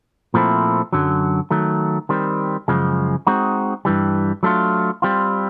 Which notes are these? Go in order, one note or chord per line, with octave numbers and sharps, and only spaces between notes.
A#2 F3 A3 C4 E4
F#2 D3 F#3
D#3 F#3 A3
D#3 G3 C4
F#2 C#3 F3 G#3
G#3 C4 D#4 F#4
G2 E3 G3
F#3 A3 D4 F4
G3 C4 F4